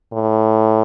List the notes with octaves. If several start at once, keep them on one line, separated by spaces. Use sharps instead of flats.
A2